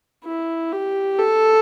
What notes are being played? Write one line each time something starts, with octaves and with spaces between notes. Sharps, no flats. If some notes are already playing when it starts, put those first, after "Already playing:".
E4
G4
A4